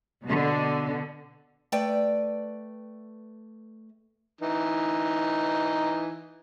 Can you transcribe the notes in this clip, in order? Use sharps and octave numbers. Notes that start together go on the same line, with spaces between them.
B2 D3
A3 B4 D5 G5
E3 D#4